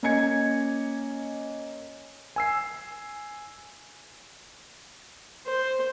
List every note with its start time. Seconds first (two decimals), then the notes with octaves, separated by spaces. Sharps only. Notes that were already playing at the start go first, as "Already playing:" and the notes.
0.03 A#3 C#4 D#5 G#5 G#6 C#7
2.36 G#5 E6 C7
5.46 C5